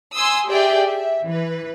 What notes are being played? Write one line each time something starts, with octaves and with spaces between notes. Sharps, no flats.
G#5 C6 D#6 E6
G4 G#4 D5 E5 G5
E5
E3 B4